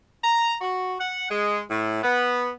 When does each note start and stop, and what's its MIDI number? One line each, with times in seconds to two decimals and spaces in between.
0.22 0.54 82
0.60 0.95 66
0.99 1.27 78
1.29 1.60 56
1.69 2.02 45
2.03 2.49 59